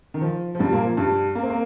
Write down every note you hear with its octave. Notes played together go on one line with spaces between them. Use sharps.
D#3
F3
F3
G2 G3
A#2 A#3
F3
G2 G3
A#3
C4
A#3